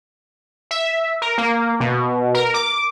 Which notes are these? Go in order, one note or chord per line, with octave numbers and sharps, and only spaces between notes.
E5
A#4
A#3
B2
A#4
D6